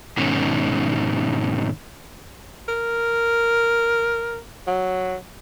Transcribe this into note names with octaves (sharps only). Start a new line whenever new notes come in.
G#2 B2 D#3 C#4
A#4
F#3